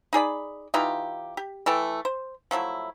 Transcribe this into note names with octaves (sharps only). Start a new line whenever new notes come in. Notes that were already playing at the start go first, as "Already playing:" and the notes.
D#4 G#4 D5 B5
E3 D#4 F4 G4
G4
E3 A3 A4 G5
C5
F3 F#3 A3 E4